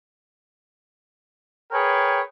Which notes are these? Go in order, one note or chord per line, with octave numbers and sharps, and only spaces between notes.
G#4 A#4 B4 C#5 G5